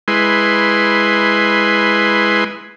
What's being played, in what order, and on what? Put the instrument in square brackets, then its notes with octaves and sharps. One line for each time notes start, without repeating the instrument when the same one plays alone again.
[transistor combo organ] G#3 E4 B4 G#5 C6